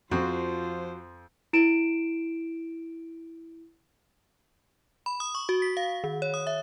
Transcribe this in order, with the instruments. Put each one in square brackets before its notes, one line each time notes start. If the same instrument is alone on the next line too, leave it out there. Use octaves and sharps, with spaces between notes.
[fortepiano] F2 [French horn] F3 [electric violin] F4 C5 [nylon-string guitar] F#4
[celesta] E4 D7 E7
[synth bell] B5
D#6
C#6
F#4
B6
F5
D#3
C#5
D#6
E5